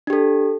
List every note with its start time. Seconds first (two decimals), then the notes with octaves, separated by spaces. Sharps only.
0.07 D4
0.10 G4
0.13 A4